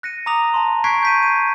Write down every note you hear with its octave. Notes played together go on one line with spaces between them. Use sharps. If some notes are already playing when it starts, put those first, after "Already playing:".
F#6 A#6 C#7 D#7
A#5 D6 D#6 A#6 F7
A5 C6
C#6 F#6 G#6 B6 C7 D7
G6 B6 D#7
D#7